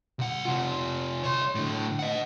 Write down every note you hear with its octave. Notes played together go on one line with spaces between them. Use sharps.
C2 F#5
C3 F4
C#5 C6
A2 D3
D#5 F#5